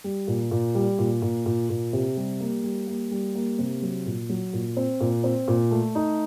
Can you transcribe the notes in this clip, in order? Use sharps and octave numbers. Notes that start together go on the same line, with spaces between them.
G3
A#2
A#2
G3
A#2
A#2
A#2
A#2
C3
G3
A#3
G3
A#3
G3
A#3
C3
F#3
A#2
F#3
A#2
C4
A#2
C4
A#2
A3
D#4